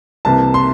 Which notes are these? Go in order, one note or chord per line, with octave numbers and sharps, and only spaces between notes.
C2 C3 E3 A#3 A5
C6